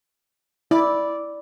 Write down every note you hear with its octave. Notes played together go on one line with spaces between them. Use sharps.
E4 D5